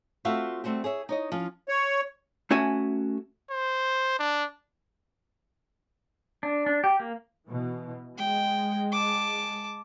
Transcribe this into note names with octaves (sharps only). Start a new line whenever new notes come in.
A3 C4 F4 F#4 E5 F5
G3 A3 C4 F#4 G4
G#4 C#5 E5
D#4 C#5 D#5
F3 C#4 F4
C#5
A3 C#4 F#4 E5 G#5
C5
D4
D4
D4
G4
A#3
B2 E3
G#3 G5
A5 D6